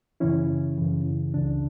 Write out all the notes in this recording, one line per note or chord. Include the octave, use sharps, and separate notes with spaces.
F#2 C#3 E3 C#4 E4
F#2 C#3 E3
C#2 C#3 E3 D4